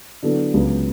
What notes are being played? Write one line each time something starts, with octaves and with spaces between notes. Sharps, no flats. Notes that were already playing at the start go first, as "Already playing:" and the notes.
D3 F#3 B3 E4 A4
C#2 C#3 F#3 B3